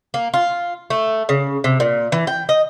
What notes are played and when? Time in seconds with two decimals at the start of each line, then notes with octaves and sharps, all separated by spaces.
0.14 A#3
0.34 F4
0.90 A3
1.29 C#3
1.64 C3
1.80 A#2
2.12 E3
2.27 G5
2.49 D#5